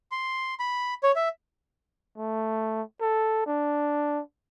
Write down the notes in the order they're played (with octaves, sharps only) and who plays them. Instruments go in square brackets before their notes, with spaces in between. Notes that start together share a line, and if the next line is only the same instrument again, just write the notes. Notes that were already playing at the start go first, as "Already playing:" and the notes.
[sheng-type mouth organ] C6
B5
C#5
E5
[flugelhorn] A3
A4
D4